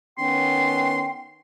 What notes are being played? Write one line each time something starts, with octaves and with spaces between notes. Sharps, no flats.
D#3 B3 C#4 G5 C6